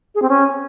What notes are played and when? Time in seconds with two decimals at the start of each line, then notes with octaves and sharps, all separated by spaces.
0.15 G#4
0.22 C4
0.29 C#4